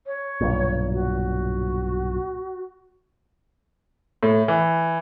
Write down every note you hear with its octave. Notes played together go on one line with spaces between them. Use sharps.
C#5
B1 G2 A#2
F#4
A2
E3